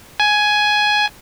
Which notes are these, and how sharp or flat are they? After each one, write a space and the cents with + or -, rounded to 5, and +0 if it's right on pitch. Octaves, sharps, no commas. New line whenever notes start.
G#5 +10